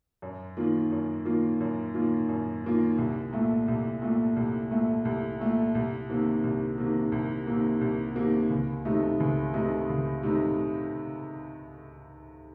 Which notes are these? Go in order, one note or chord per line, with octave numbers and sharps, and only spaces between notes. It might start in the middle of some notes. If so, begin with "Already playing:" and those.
F#2
D#3 A#3 F4
F#2
D#3 A#3 F4
F#2
D#3 A#3 F4
F#2
D#3 A#3 F4
C2
A#2 A3
C2
A#2 A3
C2
A#2 A3
C2
A#2 A3
C2
C3 D#3 A#3
C2
C3 D#3 A#3
C2
C3 D#3 A#3
C2
C3 D#3 A#3
C#2
C3 D#3 A3 D#4
C#2
C3 D#3 A3 D#4
C#2
C3 D#3 A3 D#4